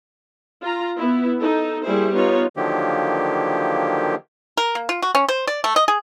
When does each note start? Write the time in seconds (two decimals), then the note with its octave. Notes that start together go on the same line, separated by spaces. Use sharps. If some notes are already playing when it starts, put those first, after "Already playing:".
0.62 F4 A#5
0.97 B3 E4
1.41 D#4 A4
1.84 G3 A#3 E4 G#4 C5
2.13 B3 D#4 F4 C#5
2.57 D3 D#3 F3 F#3 A#3 G4
4.57 A#4
4.75 A#3
4.89 F4
5.02 F#4
5.15 C#4
5.28 C5
5.47 D5
5.64 A3
5.76 D#5
5.88 G#4